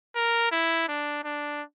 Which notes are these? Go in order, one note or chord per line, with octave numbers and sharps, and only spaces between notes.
A#4
E4
D4
D4